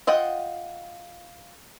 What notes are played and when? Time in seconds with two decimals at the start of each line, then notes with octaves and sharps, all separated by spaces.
0.07 F4 D#5 F#5 G5